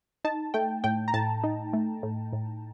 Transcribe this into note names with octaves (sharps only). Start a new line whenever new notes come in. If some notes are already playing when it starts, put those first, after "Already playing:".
D#4 A5
A3 G5
A2 G5
A#5
A2 A5
D#4
A3
A2
A2